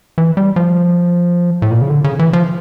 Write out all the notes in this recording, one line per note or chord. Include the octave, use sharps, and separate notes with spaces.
E3
G3
F3
A2
A#2
C#3
D3
C#3
E3
F3